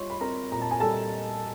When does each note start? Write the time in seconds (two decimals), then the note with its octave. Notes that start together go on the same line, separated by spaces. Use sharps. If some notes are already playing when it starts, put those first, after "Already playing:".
Already playing: G3 F4 C#5 C6 C#6
0.10 B5
0.20 C4 A#4 A#5
0.52 A#2 A#5
0.61 A5
0.71 G#5
0.80 G3 A4 A5